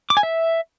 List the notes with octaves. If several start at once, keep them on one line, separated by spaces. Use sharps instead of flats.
D6
G#5
E5